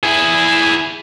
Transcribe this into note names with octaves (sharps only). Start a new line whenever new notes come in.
E4 G#4